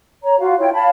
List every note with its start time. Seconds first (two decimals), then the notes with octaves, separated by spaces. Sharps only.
0.23 C#5 A#5
0.39 F4 F#4 F5
0.59 E4 F4 C#5 G5
0.74 C#5 F5 A5 B5